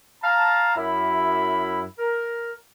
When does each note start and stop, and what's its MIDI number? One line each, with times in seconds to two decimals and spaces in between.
0.23 0.72 77
0.23 0.72 81
0.23 0.72 82
0.76 1.84 42
0.76 1.84 64
0.76 1.84 83
1.99 2.53 70